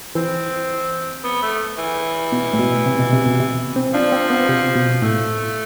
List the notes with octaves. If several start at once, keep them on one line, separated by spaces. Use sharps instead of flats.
E3 C4
B3
A3
E3
B2
A2
B2
C3
B2
C3
B2
C3
C4
F3 D4
C4
B3
C3
B2
A2 A3